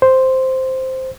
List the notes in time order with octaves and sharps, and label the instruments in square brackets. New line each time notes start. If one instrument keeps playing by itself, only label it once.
[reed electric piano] C5